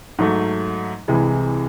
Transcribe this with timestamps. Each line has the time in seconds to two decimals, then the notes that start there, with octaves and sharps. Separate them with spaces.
0.19 G#2 F#3 A3
1.08 C2 C3 E3 G#3